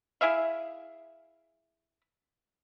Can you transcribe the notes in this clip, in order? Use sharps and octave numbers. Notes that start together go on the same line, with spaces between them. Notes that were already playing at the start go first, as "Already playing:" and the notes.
E4 G#4 E5 F5